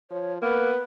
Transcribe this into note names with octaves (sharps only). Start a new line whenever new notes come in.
F3 C#5
A#3 B3 B4